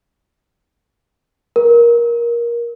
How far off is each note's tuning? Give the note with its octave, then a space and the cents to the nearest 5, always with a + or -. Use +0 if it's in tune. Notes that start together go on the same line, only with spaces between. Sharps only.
A#4 +20